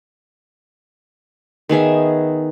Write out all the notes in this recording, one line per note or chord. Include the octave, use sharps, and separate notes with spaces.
D#3 B3 G#4 E5